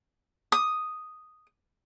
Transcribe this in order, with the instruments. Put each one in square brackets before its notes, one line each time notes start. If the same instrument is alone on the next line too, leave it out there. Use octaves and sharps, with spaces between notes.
[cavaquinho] D#6